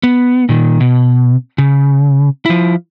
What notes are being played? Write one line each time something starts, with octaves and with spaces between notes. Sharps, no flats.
B3
A#2 D#3
B2
C#3
F3 E4